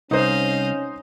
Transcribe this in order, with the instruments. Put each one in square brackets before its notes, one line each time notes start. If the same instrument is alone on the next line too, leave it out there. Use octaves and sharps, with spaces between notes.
[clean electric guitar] C2 [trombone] C#4 [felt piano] D#4 C5 [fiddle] D#5 F5